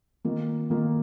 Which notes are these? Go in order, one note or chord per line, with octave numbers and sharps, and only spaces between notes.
D#3 A#3 F4
D#3 A#3 F4